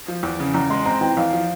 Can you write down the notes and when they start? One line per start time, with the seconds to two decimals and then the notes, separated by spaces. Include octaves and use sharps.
0.08 F3
0.23 E2
0.40 C#3
0.54 E2 A#5
0.70 G#3 C6
0.86 C4 A#5
1.01 E3 G5
1.17 E2 F5
1.33 F3